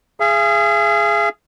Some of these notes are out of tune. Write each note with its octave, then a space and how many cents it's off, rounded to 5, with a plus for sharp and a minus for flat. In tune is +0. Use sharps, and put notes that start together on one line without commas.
G#4 +0 F5 -45